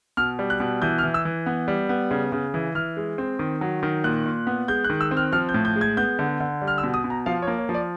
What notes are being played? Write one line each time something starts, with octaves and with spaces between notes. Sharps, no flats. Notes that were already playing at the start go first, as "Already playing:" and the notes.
B2 F6
G3
F#6
B2
E3 G6
F6
E3
E6
E3
B3
G3
B3
C#3
C#3
E3
E3 F6
G#3
C4
D#3
F#3
D#3
A#2 F#6
A#2
B3
G#3 G6
F#6
D#3
E6
C4
F6
F3 F6
G6
A2
G6
G#3
G#6
B3 G6
D3
D3
G3
F6
E6
B2
D#6
B2
A#5
F3 F5
C#5
A#3
C#5
F3
D5